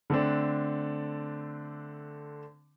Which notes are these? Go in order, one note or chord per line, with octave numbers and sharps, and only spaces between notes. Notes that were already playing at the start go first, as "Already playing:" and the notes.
D3 A3 C4 D4